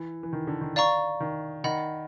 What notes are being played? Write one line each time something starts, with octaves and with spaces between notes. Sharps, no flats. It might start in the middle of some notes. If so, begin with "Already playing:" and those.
Already playing: E3
E3
D#3
D3
D#3
D5 F5 A#5 C#6
D#3
D#3 D#5 F#5 B5